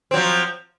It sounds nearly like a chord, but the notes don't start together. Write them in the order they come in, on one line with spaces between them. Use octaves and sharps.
C4 F#3 F3